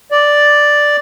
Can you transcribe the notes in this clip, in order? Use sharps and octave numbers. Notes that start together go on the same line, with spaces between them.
D5